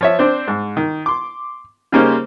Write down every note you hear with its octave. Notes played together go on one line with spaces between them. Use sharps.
F3 C#5 E5
C4 D4 C5
G#2
D#3
C6 D6
C#3 G3 A#3 C#4 D#4 C5